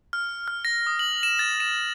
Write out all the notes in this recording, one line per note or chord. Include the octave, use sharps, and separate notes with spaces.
F6
F6
A#6
D#6
F#7
E7
A6
E7